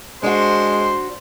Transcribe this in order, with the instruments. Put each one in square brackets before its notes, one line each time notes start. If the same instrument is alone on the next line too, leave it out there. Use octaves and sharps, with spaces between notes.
[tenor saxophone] G#3 [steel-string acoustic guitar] D4 F#4 [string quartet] C5 C6